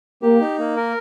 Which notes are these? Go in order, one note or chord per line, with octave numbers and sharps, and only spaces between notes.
A#3 G4
D#4
A#3
A#4